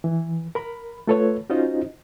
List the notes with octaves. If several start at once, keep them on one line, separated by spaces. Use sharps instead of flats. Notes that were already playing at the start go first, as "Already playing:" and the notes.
E3
A#4 B5
A3 F4 A4 B4 C#5
C#4 D#4 F4 F#4 C5 D#5